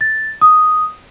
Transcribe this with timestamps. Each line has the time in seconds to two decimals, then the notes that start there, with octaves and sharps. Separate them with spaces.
0.01 A6
0.41 D#6